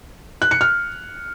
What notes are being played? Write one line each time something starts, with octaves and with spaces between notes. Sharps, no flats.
F#6
C#7
F6